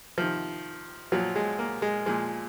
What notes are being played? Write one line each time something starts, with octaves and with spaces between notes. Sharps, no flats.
C3 D#3 F3
A#2 F3 F#3
G#3
A#3
G#3
A#2 F3 G#3